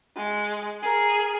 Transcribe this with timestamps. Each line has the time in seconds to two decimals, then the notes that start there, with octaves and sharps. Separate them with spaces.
0.16 G#3
0.83 G#4 A#4